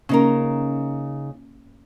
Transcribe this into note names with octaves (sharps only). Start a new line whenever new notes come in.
C#3 A#3 C#4 D#4 A#4